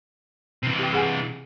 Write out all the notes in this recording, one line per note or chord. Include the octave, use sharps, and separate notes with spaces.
C3 E3
G4 G5
G#4 F#5 G#5